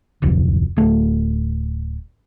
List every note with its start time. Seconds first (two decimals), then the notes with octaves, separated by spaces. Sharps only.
0.22 D1 C2 F2
0.77 D1 A3